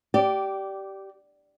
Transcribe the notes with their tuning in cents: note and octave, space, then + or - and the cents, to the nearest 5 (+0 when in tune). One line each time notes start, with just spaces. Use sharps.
G4 -15 D5 +0